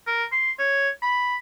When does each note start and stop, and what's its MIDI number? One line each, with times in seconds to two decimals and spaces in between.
0.07 0.24 70
0.32 0.51 84
0.59 0.89 73
1.02 1.35 83